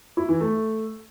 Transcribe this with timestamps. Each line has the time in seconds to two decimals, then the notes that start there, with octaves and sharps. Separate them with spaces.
0.17 E4
0.29 E3
0.41 A3